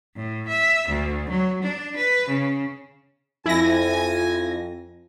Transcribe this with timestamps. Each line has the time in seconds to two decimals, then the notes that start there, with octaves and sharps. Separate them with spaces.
0.16 A2
0.48 E5
0.89 D2
1.30 F#3
1.63 D4
1.97 B4
2.28 C#3
3.46 F2 E4 G#5 A#6